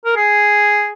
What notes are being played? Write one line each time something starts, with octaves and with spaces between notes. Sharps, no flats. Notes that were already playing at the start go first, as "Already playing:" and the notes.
A#4
G#4